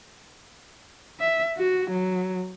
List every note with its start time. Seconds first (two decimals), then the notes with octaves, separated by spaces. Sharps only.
1.20 E5
1.58 F#4
1.91 F#3